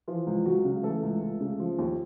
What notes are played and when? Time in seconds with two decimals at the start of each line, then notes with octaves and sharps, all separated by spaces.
0.08 E3 F3 F4
0.27 C#2
0.46 C#2 F#3 F#4
0.65 C#3
0.83 E3 A3 A4
1.03 C#2
1.22 C#2
1.40 C#3
1.60 F3
1.78 D#2